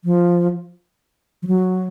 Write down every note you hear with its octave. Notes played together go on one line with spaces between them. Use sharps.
F3
F3
F#3